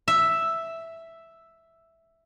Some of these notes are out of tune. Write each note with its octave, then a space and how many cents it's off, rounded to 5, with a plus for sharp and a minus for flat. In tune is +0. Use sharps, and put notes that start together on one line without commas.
E5 +0